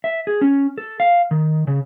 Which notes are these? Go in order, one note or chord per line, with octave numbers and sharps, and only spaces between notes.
E5
G#4
C#4
A4
F5
D#3
C#3